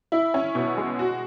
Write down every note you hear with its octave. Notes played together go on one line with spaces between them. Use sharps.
E4
C#4
B2
G#3
F#4